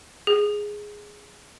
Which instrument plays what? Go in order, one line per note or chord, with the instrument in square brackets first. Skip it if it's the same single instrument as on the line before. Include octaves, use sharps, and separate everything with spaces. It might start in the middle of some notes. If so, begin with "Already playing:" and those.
[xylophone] G#4